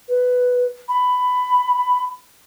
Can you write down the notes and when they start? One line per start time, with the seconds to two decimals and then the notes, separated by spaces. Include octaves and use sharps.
0.08 B4
0.89 B5